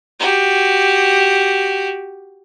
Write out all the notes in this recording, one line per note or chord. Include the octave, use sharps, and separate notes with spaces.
F#4 G4